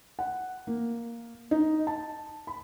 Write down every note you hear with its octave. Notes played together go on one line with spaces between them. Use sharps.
F#5
A#3
D#4
A5
B5